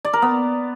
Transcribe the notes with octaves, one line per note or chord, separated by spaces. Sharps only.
D5
A#4
B3